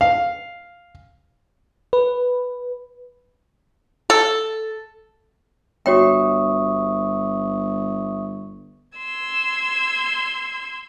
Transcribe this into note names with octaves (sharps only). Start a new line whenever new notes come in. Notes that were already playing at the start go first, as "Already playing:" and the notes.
F5
B4
A4
G1 F#4 C#5 E5 G5 C#6 D#6
C6 E6 G#6